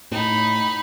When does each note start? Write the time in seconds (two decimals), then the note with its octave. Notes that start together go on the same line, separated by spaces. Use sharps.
0.11 A2 D#4 B5